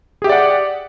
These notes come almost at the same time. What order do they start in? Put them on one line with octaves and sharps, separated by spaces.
G#4 G4 E5 D5 F#5